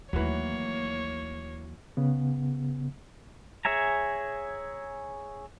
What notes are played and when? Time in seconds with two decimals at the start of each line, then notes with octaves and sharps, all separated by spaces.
0.13 D#2 E3 F#3 A3 A#3 C#5
1.97 C#3 B3
3.65 G#4 C#5 E5 G#5 A#5